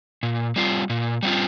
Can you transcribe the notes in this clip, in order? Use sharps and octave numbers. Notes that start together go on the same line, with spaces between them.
A#2
G3 C4 F4
A#2
G3 C4 F4